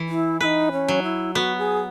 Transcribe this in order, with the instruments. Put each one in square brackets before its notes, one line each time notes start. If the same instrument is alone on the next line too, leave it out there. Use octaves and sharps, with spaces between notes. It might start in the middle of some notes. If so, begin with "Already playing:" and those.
Already playing: [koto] E3
[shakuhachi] E4
[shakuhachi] E4 [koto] B4
[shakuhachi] D#4
C#4
[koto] F#3
[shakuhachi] E4
[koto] B3 [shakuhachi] F#4
[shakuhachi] G#4